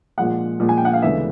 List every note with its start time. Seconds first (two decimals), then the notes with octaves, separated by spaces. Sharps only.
0.17 A#2 F3 G#3 F#5
0.60 A#2 F3 G#3
0.69 G#5
0.77 G5
0.85 F#5
0.93 F5
1.02 D2 C#3 E3 G#3 B3 E5